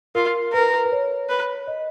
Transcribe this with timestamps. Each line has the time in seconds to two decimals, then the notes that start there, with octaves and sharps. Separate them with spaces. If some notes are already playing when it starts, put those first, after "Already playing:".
0.15 F4 A#4
0.53 A#4 B4
0.85 B4
0.92 C#5
1.29 B4
1.67 D#5